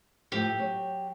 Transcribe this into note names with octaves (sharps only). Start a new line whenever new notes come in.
A2 F3 G4
F#3 C#5